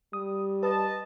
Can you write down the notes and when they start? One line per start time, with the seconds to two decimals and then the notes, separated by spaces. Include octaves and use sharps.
0.13 G3 D#6
0.63 B4 D#5 A5